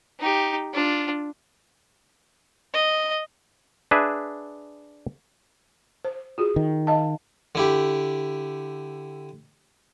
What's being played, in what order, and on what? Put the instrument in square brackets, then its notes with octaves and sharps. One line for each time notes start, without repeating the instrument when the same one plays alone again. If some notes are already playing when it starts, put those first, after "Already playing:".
[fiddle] D#4 G4
D4 F4
D#5
[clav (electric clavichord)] D4 G#4 B4 E5
[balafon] C5
F4 F#4 G#4
[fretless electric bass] D#3
[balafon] D#5 F5 A5
[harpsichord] D3 E4 G4